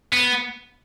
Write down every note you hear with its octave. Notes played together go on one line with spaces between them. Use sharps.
B3